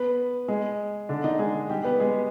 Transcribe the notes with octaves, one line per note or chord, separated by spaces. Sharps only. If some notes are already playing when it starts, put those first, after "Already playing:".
Already playing: B3 B4
G#3 G#4
D3 D4
D#3 D#4
G#3 G#4
G3 G4
B3 B4
G#3 G#4